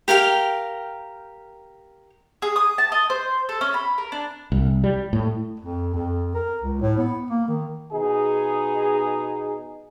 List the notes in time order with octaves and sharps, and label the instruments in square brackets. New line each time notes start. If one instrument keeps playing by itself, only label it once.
[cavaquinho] G4 A#4 F5 G5
[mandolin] G#4
D#6
A5
D#5
C5
A4
C#4
B5
A#4
D4
[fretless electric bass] C2
G3
A2
[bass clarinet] F2
F2
A#4
C#2
A2
B3
A#3
D#3
[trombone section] B2 D#4 G#4